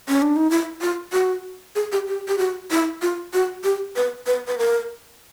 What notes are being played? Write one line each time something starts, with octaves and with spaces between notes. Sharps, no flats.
C#4
D4
D#4
E4
F4
F#4
G#4
G4
G4
G4
F#4
E4
F4
F#4
G4
B4
B4
B4
A#4